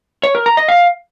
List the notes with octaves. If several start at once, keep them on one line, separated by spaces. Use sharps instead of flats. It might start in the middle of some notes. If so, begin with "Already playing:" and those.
C#5
A#4
A#5
D#5
F5